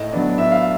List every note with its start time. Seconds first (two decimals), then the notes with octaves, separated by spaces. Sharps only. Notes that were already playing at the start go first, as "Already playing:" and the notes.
Already playing: A2 D#5
0.13 F#3 B3 D4
0.38 A2 E5
0.52 F5